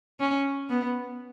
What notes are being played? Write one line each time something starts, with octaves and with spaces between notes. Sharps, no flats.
C#4
B3